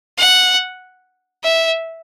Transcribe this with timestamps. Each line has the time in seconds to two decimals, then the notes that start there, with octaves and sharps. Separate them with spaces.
0.18 F#5
1.44 E5